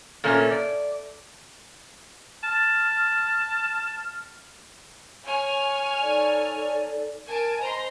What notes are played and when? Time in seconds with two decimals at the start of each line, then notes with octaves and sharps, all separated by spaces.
0.24 A#2 A3 A#3 C#4
0.51 D5
2.43 A5 F6
5.27 C#5 G#5 F6
6.01 D#4 A4 D5
7.28 A#4 G#5 A5 D7
7.59 C5 D#5 A#5 C6